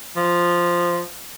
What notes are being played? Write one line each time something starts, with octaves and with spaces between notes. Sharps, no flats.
F3